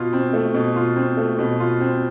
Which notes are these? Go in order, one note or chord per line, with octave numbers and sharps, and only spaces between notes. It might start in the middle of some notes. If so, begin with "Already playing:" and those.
Already playing: B2 F4
C4
A3
B2
F4
C4
A3
B2
F4
C4